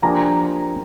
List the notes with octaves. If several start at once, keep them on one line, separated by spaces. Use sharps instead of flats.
F3 A#3 D4 G4 G#5 A#5